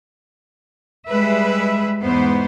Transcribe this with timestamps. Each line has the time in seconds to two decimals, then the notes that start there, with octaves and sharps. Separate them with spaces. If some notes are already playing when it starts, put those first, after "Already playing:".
1.08 G3 G#3 G#4 B4 E5
2.02 E2 G#2 B3 C5